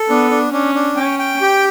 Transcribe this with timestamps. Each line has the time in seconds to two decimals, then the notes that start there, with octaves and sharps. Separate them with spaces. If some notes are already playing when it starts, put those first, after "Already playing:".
Already playing: A4
0.09 B3 D4
0.31 D4
0.52 C#4 D4
0.74 D4
0.96 C#4 G5
1.19 G5
1.41 G4